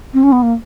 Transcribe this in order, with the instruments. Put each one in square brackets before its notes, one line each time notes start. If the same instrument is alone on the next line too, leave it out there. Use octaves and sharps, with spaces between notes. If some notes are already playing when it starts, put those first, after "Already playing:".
[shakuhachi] C4
C#4
B3
A#3